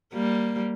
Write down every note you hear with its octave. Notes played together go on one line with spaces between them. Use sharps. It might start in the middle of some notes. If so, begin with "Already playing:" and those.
G3 A#3